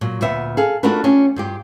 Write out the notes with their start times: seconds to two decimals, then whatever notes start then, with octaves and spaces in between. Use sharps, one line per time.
0.01 A#2 F#3
0.21 D2 A#2 B3 E5 F5
0.57 G#4 A4 F5
0.83 A3 D4 F4 F#4 A#4 B4
1.04 C#4 D4 F4 G4
1.36 G2 F4 G4